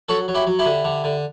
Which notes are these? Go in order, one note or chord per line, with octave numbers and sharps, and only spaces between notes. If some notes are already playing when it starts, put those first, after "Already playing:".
F#3 F#4 A4
F#3
E4 G4
F#3
E4 G4
D3
D3
D3